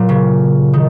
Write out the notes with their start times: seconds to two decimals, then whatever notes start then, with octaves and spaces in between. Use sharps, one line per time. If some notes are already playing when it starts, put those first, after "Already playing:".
Already playing: A#2 F#3
0.09 C#3
0.73 D#3